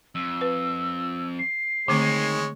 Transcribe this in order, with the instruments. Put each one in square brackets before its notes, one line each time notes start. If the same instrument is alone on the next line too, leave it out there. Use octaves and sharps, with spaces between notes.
[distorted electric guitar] F2 [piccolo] E6
[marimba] B4
[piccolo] C7
[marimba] D3 A3 C4 [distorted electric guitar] D#3 [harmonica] G#3 C#5